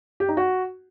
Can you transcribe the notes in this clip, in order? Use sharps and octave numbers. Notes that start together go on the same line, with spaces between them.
G4
D#4
F#4